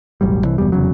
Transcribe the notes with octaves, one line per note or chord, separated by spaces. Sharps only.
E1 A1 F#3 G3
C2 E3
F#1 E2 B2 G3
F1 E2 C#3 F#3